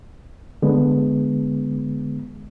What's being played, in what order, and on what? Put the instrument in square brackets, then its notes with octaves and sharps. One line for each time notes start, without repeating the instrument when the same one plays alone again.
[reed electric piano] D3 G#3 B3